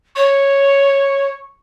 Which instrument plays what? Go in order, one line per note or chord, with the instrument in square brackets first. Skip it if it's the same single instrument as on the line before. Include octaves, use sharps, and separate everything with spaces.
[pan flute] C#5 [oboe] C#6